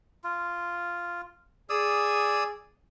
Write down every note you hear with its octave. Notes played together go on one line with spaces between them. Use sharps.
F4
G#4 D5 D#6 E6